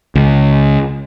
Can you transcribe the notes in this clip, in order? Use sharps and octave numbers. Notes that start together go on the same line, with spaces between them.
C#2